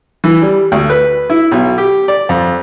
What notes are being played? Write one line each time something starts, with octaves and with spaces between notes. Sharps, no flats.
E3
G3
D2
B4
E4
B1
G4
D5
F2